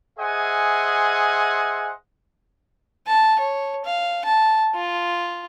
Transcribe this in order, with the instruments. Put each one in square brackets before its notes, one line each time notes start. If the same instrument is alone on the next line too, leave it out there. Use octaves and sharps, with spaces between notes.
[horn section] G#4 C5 D#5 E5 F#5 G#5
[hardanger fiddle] A5
C#5
F5
A5
F4